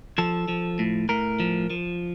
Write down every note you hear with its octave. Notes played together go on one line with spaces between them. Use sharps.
F3 A4
F3
A2
A2 A#4
F3
F3